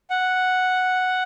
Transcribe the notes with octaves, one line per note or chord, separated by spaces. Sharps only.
F#5